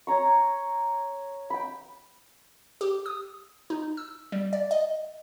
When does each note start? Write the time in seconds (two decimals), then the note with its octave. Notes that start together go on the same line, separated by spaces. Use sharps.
0.07 C#5 A#5 C#6
1.50 G5 B5
2.81 G4
3.06 D#6
3.70 D#4
3.97 E6
4.32 G3
4.53 D5
4.71 D#5